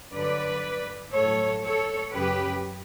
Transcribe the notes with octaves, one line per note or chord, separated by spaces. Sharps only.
G2 D3 F#3 B4 D5
A2 F#3 A4 C#5
A4 C#5
F#2 C#3 F#3 G4 B4